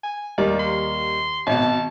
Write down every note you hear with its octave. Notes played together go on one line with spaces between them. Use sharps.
G#5
D#2 G3 A#3 D5
C6
G#1 B2 A5